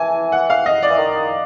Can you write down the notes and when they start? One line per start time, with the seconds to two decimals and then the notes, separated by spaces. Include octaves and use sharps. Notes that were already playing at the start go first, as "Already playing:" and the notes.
Already playing: E3 G#5 A5
0.32 F#5
0.50 F5
0.66 D#5
0.83 D5
0.90 E3
0.99 D#3